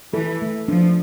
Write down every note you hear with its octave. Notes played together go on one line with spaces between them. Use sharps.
E3 A4
A3
F3 D4